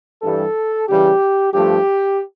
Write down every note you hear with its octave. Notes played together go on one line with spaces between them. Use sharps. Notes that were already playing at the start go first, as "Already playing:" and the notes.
G2 E3 G3 A4
C#3 E3 G3 G4
G2 F3 A3 G4